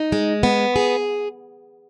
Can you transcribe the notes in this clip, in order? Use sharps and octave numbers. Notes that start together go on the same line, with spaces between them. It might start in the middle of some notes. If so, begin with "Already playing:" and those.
Already playing: D#4
G#3
B3
G#4